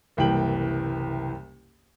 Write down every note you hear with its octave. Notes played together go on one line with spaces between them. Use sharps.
F#1 C2 E3 G5 F#7